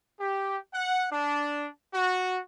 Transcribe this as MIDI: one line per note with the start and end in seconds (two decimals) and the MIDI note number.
0.20 0.58 67
0.74 1.07 78
1.12 1.68 62
1.94 2.40 66